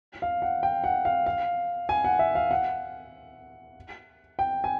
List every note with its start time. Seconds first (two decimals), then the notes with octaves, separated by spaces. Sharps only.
0.22 F5
0.42 F#5
0.63 G5
0.84 F#5
1.05 F5
1.26 F5
1.89 G#5
2.04 F#5
2.19 E5
2.35 F5
2.51 F#5
4.39 G5
4.64 G#5